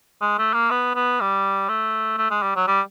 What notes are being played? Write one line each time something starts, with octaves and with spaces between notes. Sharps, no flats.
G#3
A3
A#3
B3
B3
G3
A3
A3
G#3
G3
F#3
G3